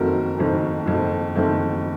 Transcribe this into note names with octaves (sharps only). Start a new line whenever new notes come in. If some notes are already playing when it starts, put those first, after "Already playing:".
Already playing: F#1 F2 D#3 A3 C4 F#4 A#4
F#1 F2 D#3 A3 C4
F#1 F2 D#3 A3 C4
F#1 F2 D#3 A3 C4